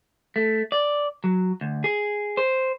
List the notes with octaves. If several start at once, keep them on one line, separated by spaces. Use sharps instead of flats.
A3
D5
F#3
D2
G#4
C5